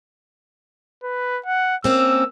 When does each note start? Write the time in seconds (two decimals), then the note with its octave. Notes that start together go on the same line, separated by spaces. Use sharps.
1.03 B4
1.45 F#5
1.84 A#3 C4 C#4 E6